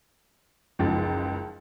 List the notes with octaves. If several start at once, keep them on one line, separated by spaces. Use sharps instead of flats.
F#1 C#2 G#2 F3 A6